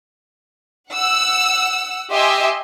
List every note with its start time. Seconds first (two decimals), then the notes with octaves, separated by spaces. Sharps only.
0.91 F#5 E6
2.12 G4 D#5 E5 G#5 C6